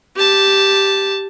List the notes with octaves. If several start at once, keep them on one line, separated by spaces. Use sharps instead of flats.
G4 A5